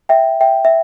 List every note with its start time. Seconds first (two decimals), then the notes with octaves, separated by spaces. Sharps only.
0.09 E5 G5
0.41 E5 G5
0.65 E5